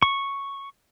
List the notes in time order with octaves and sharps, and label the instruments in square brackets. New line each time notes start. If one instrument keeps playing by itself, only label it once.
[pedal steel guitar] C#6